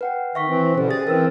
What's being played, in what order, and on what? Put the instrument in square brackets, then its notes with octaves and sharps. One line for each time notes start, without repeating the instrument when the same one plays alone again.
[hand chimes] B4 F#5 G5
[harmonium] D#3 [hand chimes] E5 C#6 B6
[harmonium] E3 C4
[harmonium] B2 D3 G3 [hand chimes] C#4 C5
[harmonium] G#4 [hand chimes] E5 A6
[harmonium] E3 C4 [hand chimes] A#4 B4 E6